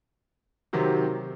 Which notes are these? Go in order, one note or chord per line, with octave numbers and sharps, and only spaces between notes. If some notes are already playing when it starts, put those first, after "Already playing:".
C3 D#3 F#3 C4 G4